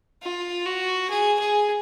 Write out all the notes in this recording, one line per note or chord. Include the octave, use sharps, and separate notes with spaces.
F4
F#4
G#4
G#4